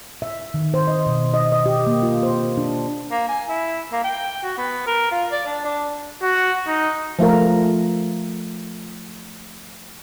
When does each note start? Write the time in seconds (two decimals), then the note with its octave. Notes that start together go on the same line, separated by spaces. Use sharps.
0.22 E5
0.54 D#3
0.74 C5
0.87 D#5
1.06 B2
1.34 D#5
1.52 D#5
1.66 G4
1.87 A#3
2.03 F4
2.23 C5
2.58 D4
3.11 A#3
3.28 G#5
3.49 E4
3.92 A#3
4.04 G5
4.43 F#4
4.57 B3
4.87 A#4
5.11 F4
5.31 D5
5.46 D4
5.65 D4
6.22 F#4
6.67 D#4
7.19 F3 A3 F4 A#4